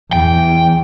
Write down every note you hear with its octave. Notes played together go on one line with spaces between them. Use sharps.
E2 G5